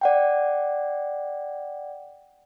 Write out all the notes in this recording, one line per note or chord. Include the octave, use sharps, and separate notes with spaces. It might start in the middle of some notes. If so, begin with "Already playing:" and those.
D5 F#5 G5